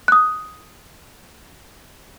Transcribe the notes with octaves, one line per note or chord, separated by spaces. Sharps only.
D#6 F#6